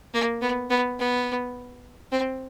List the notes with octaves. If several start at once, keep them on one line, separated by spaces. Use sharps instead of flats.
A#3
B3
B3
B3
C4